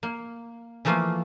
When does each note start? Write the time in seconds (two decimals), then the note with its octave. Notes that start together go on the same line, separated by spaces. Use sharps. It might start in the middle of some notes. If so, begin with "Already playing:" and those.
0.03 A#3
0.85 E3 F3 A3 A#3 F4